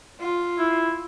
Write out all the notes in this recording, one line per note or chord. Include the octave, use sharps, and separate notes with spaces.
F4
E4